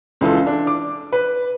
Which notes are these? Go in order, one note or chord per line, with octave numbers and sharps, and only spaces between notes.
C#2 E3 F4 A4
D4
D6
B4